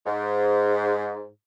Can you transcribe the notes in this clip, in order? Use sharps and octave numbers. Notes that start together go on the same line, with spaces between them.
G#2